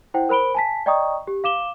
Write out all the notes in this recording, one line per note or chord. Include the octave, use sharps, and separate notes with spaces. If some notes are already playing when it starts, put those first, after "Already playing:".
E4 C5 F#5 G5
A#4 C5 B5 D7 G7
G#5 A5 B6
D5 D#5 G5 A#5 C#6 D#6
G4
F5 D6 E7 G7